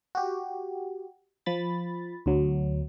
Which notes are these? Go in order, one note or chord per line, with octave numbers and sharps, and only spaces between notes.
F#4 G4
F3 B5 A6
D2 F#3